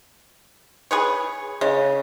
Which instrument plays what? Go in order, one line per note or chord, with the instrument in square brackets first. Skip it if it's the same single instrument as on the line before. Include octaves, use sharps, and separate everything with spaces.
[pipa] G#4 B4 C#5
[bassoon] C#3 [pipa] G#3